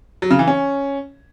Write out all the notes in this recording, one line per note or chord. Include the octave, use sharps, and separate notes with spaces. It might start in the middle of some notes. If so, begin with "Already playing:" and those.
F#3
C#3
E3
C#4